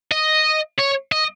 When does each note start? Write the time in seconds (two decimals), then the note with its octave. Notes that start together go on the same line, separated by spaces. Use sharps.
0.12 D#5
0.79 C#5
1.12 D#5